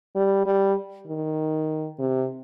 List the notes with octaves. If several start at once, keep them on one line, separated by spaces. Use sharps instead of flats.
G3
G3
D#3
C3